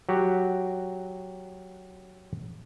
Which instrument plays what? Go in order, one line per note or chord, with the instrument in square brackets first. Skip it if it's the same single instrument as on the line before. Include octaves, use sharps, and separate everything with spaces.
[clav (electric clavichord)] F#3 F#4 G4